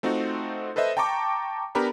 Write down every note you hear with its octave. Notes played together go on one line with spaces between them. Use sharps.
A3 C4 D#4 F4 F#4
A4 B4 C5 D#5 E5
G5 A5 A#5 C#6 D6
B3 D4 G4 A#4 A#5 B5